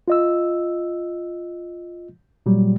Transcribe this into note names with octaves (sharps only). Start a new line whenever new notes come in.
F4 D#5 E6
A#2 F#3 G3